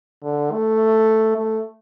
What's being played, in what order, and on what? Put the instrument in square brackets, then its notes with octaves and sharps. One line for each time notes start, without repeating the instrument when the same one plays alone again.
[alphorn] D3
A3
A3